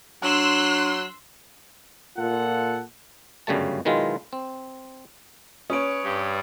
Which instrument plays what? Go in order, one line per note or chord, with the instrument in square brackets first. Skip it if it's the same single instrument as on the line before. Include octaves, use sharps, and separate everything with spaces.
[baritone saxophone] F#3 [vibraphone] D4 [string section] C6 E6 [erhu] F#6
[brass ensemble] A#2 F4 A4 F#5
[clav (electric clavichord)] G1 F#2 C#3 G3 A3 A5
B2 D#3 F#3 G#3 E4 F4
C4
[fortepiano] C#4 [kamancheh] B4 C#5 [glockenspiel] D#6 D7
[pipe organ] G2 G3